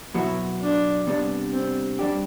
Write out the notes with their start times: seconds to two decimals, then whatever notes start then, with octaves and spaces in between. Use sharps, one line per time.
0.14 B2 F#3 B3 E4 F#4
0.61 D4
1.07 C3 G3 B3 D4
1.53 C4
1.99 G3 D4 G4